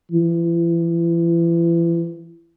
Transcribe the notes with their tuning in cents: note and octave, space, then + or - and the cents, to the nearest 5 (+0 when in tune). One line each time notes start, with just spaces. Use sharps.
E3 +35